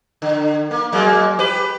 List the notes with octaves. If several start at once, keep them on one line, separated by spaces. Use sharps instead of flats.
D3
A#3
F#3 G#3 A#3
G4 B4